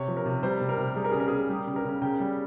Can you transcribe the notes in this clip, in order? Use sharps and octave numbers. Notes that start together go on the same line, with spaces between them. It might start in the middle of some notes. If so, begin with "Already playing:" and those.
Already playing: C3 C#5
F3
A#4
C3
G3 C5
C3
A#4
C3
G3 G#4
A#4
G#4
C#3
A#4
C#3 G#4
G3 G4
C#3
A#4
C#3
C#3 G5
G3